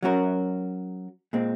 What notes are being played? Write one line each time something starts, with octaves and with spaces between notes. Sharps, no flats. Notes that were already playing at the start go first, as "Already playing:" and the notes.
F#3 C#4 F#4 A#4
A#2 G#3 C4